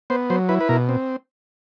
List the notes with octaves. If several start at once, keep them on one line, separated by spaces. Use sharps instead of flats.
B3 C5
F#3 C5
E4 B4
B4
B2 A#4
C4